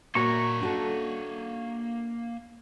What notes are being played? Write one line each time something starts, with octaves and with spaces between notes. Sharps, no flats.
A#2 A#3 F#4 C#5 E5 A#5 C#6
D4 F#4 A4